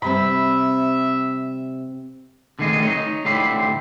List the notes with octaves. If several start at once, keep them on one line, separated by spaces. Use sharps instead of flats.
C3 G3 C4 E5 B5
D3 D#3 G3 A3 G#4 D#5
D#4 C#5 D#5
A2 D3 G4 C5 E5 B5